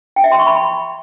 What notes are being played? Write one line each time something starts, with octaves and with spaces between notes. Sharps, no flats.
G5
E5
C6
C#6
B5